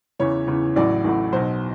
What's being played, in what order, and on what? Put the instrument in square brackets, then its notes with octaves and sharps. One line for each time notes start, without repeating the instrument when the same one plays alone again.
[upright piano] E2 C#3 E3 C#5
E2 C#3 E3
A1 A2 F#3 D5
A1 A2 F#3
B1 B2 F#3 C5